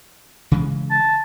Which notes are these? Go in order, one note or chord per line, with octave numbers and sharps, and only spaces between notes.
C#3 E3 G#3
A5